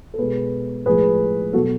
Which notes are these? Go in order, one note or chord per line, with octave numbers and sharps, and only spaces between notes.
A4
B2 G#3 G#4 B4
A2 F3 G#3 G#4 B4
B2 F#3 F#4 A4